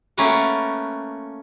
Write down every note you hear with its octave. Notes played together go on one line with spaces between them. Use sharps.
A3 A#3 C#4 A#4 B4 F#5